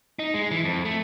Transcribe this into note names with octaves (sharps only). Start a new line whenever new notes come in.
D#4
G#3
E3
F2
A3